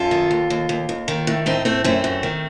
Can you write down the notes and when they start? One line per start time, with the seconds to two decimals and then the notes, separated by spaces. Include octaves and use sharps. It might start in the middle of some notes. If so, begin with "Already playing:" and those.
Already playing: F#2 F4 A4
0.11 D#3
0.31 D#2
0.50 D#2
0.69 D#2
0.89 D#2
1.08 D#3
1.27 A2
1.46 A2 C4 D#4
1.65 A2 A3 C4
1.84 F#2 A3 C4
2.04 F#2
2.23 D#3